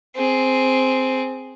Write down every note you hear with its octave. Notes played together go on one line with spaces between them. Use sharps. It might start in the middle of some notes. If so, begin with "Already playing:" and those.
C4 G#4